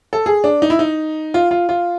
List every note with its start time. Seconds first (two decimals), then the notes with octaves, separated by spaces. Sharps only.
0.13 A4
0.26 G#4
0.44 D4
0.62 D#4
0.70 E4
0.79 D#4
1.34 F4
1.51 F4
1.69 F4